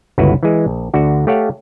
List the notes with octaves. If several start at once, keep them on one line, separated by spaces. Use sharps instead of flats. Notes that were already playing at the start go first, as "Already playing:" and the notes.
G1 C#2 E4 F#4 B4
E3 G#3
A#1
D2 D3 F#4
A3 G4 C#5 F5 F#5